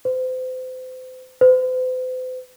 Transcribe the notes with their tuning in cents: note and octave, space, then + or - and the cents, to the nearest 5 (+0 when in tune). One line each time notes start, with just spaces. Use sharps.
C5 -35
C5 -45